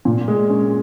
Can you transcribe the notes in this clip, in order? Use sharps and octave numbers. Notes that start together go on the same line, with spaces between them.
A#2
G#3
C#4